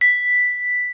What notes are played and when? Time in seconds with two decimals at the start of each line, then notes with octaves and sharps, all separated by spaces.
0.01 B6